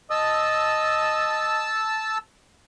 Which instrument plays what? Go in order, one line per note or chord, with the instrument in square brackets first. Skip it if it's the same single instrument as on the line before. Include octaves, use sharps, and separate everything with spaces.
[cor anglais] D#5 [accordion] A5 E6